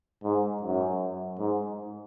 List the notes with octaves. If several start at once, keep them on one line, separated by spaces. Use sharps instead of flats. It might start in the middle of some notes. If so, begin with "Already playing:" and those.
G#2
F#2
G#2